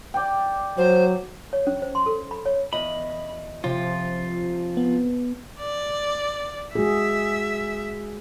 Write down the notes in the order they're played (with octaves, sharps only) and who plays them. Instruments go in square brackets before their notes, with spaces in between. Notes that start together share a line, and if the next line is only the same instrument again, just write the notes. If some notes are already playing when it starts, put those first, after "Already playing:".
[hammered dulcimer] D5 G5
[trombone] F#3 [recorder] C5
[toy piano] C#5
C#4
C5
C6
A4
B5
C#5
[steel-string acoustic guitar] E2 D#5 [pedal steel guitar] B5
[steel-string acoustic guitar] C3 [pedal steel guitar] F3 F4
[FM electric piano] B3
[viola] D5
[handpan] G#3 F#4 G#4 [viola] E5